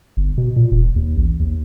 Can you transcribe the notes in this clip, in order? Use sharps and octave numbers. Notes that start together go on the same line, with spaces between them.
G1
B2
A#2
E1
D#2
A1
D#2